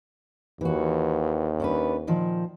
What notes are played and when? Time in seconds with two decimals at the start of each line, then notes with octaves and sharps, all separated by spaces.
0.61 D#2 E3 F#4
1.60 C#4 D4 B4
2.07 A#2 D#3 F3